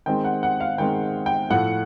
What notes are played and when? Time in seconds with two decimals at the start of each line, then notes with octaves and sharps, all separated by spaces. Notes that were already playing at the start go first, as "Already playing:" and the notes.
0.06 D#3 G#3 C4 G5
0.25 F#5
0.43 F#5
0.60 F5
0.78 D#3 G#3 C4 G5
1.26 G5
1.50 A2 F3 A3 F#5